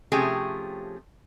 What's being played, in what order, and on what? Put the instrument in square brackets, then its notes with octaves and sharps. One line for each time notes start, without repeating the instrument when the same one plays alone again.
[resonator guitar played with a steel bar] C3 F3 A3 C#4 G4 G#4